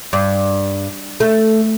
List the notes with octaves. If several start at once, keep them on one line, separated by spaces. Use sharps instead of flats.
G2
A3